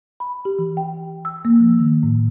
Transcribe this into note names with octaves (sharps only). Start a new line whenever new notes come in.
B5
G4
E3
G5
E6
A#3
F3
D#3
A2